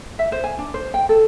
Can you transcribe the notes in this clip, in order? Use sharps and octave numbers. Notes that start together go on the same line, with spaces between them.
E5
C5
G#5
D4
C5
G5
A4